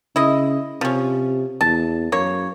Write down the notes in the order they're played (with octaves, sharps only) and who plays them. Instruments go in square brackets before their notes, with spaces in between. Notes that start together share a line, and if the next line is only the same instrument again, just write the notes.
[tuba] C#3 [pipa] E4 D#5
[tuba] C3 [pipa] F3 C#4
[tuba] E2 [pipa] A5
[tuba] F#2 [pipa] A#3 C#5